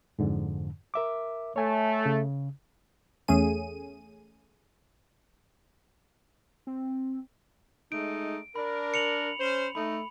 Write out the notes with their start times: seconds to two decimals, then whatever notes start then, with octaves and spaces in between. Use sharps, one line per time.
0.19 F2 G#2 D3
0.94 A#4 E5 D6
1.56 A3 C#5 G#5
2.06 C#3
3.28 E2 A3 C#4 G#4 D#7
6.67 C4
7.92 G#3 A3 D#4 D7
8.56 D4 A#4 B5
8.94 C#7 F7 F#7
9.39 C#4 C5
9.75 A3 D#4 B5